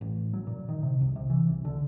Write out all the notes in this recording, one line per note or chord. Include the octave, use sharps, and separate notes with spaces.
A1
F#3
A#2
D#3
C3
C2
C3
E3
C2
D3